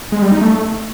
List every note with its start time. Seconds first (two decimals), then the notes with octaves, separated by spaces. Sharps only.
0.12 G#3
0.22 G3
0.32 D#4
0.41 A3